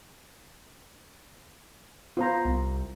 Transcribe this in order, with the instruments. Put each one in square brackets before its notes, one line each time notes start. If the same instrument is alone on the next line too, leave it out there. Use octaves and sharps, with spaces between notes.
[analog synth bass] B3 [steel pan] F4 C5 A#5
[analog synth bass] C2